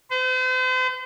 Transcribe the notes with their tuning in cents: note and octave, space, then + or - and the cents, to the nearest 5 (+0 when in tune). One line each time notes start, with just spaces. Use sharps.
C5 -40